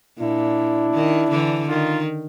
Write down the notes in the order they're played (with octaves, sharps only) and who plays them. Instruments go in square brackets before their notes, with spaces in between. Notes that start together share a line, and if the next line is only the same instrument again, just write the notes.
[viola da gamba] A#2 [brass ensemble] D4 E4
[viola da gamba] D#3
D3 E3
[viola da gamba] D#3 [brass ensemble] D#4 F4